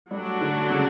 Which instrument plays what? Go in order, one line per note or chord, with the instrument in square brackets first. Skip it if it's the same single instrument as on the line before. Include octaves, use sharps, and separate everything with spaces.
[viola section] F#3 A3 D4 F#4 [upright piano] G3
[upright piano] D3
C#3